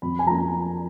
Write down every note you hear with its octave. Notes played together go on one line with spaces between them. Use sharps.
F2 B5
G#5
F3 A#3 A#5